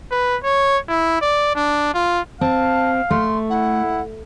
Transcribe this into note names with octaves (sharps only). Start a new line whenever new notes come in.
B4
C#5
E4
D5
D4
F4
C4 F5 A5
A3 C6
E4 F#5